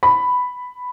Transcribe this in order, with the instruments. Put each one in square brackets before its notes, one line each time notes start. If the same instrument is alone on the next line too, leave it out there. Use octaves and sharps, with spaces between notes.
[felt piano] B5